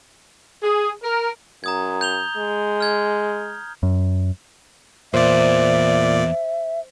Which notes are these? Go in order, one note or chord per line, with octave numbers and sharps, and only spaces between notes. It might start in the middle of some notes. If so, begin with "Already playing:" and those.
G#4
A#4
F#2 A#5 D#6 G#6
G6 F7 G7
G#3
F6 G#6
F#2
E2 A#2 C5 D5 E5